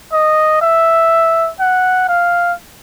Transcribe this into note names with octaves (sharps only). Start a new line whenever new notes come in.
D#5
E5
F#5
F5